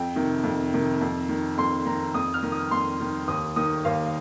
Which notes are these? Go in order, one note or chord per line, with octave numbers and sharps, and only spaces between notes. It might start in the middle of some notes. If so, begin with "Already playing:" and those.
Already playing: F2 G5
C3 D#3
F2
C3 D#3
F2
D#3
F2 C6
D#3 A#5
F2 D#6
F6
D#3
D#6
F2 C6
D#3
D#2 D#6
D#3 D#6
D#2 F5